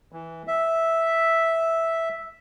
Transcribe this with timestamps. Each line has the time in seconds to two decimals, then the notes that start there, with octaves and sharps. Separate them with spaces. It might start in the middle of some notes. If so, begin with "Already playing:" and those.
0.12 E3
0.47 E5